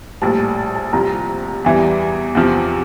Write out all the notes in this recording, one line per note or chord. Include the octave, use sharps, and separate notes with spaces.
A#1 A2 G3 A5
A5
C2 C3 F3 A#5
E2 E3 G3
E2 C3 F3